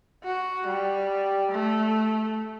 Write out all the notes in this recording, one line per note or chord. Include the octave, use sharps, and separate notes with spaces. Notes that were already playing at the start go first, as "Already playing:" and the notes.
F#4
G3
A3